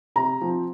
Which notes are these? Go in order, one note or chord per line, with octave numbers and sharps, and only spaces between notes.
C3 A#5
F3 C4